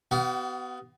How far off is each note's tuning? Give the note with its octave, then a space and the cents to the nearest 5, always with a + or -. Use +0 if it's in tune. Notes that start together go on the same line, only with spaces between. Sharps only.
B3 +20 F#4 +45 F5 +0